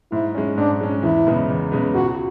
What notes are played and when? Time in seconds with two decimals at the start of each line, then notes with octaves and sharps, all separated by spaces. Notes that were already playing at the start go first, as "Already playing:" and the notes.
0.12 G#2 E4
0.35 G#3 C#4
0.57 G#2 D4
0.81 G#3 C#4
1.03 E2 E4
1.27 C#3 G#3 B3
1.50 E2
1.72 C#3 G#3 B3
1.95 C#2 F#4